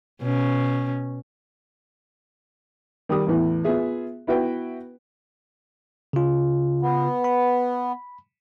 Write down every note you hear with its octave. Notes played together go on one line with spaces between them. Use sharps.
B2 C#4
D#3 G3 G4 D#6
E2 A2 E3
B3 F4 G#4 E5
B3 E4 F#4 B4 G5
C#3 F4
B3
B5